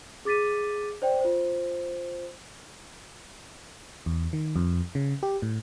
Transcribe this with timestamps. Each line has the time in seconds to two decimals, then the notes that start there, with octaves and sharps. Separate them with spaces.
0.25 G#4 D6 A6 B6 D#7
1.02 C5 D5 G5
1.21 F4 C5
4.06 E2
4.33 D#3
4.56 F2
4.95 C#3
5.23 G4
5.42 A2